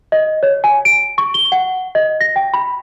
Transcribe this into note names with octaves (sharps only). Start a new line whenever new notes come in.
D#5
C#5
G#5
D7
C#6
G7
F#5
D#5
A#6
G5
B5